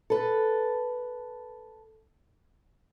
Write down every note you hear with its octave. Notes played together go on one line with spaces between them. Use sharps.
A4 B4